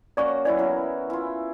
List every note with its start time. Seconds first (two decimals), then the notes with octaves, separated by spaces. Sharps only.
0.17 A#3 C#4 F#4 D5 C#6
0.45 E3 F#3 E4 D5
0.58 B3 E4 A#4
1.10 E4 F4